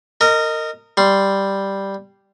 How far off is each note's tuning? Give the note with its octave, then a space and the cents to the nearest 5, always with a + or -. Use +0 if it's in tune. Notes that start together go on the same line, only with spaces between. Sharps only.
A#4 -25 D#5 +0
G3 +0 C6 +0